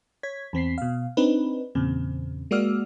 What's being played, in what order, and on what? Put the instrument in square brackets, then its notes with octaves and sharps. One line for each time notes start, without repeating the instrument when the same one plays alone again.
[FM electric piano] C#5 G#6 B6
E2 C4 B6 C7
B2 F5
C4 D4 D#4 B4
E2 A#2 C#3 C4
G#3 A#3 F#4 D5 E6 F6